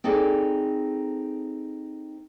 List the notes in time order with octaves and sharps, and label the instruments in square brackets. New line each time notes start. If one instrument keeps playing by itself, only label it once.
[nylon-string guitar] C4 D#4 G#4 A4 D5